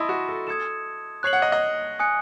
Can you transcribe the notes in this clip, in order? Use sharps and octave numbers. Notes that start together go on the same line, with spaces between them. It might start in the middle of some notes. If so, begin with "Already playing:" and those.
Already playing: E4 D#5 A5 C6 D#6 A6 D#7
F#4
A4
A4 D#6 G#6 C#7 E7
C#5 F#6 C7 F#7
F#5
D#5
D#5
G#5 D#6 F#6 C#7